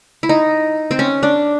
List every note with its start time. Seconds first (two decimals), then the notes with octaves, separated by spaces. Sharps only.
0.23 E4
0.29 D#4
0.91 C4
0.99 C#4
1.23 D4